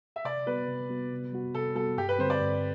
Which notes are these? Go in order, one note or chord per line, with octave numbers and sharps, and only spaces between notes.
E5
C3 D5
G3 B3 F#4 B4
C3
G3 B3 F#4
C3
G3 B3 F#4
C3 A4
G3 B3 F#4 A4
G2 G4
B4
D3 G3 C4 C5
D5
G2